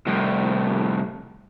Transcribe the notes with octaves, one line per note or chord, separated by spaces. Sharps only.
C2 A2